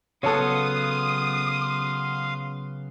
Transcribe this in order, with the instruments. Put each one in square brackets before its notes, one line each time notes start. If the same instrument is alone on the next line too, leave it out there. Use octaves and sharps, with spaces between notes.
[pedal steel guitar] C#3 F#3 B3 [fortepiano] A4 C#5 [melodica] F5 C6 [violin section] D#6